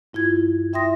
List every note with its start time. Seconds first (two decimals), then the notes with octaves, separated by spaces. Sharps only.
0.13 G2 E4 F4 G#6
0.73 E4 E5 G5 C6 D#6 A#6